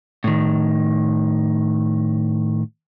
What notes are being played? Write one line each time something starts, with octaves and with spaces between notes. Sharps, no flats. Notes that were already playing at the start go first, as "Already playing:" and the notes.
A2 D#3